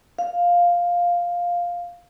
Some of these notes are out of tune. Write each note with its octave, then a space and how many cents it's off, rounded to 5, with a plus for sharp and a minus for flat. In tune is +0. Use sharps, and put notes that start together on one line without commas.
F5 +5